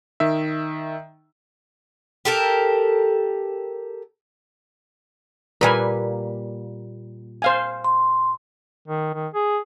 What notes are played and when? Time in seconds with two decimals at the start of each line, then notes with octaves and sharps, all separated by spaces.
0.20 D#3 E5
2.25 G4 A4 A#4
5.61 A#2 G3 A#3 A#4 B4 G#5
7.42 C5 F5 G#5
7.84 C6
8.88 D#3
9.14 D#3
9.34 G#4